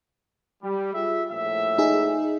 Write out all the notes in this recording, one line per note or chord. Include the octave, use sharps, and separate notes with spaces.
G3
F4 G#4 E5
A#1 A2 E5
D#4 G#4